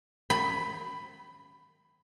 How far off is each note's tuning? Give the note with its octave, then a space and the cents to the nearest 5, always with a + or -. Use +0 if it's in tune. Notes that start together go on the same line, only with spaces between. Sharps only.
B5 +10